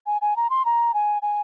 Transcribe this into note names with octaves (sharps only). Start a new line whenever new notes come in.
G#5
G#5
A#5
C6
A#5
G#5
G#5